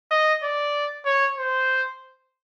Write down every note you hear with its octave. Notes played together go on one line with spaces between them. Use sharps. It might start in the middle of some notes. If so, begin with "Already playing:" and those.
D#5
D5
C#5
C5